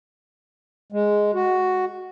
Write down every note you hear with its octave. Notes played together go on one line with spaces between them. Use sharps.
G#3
F#4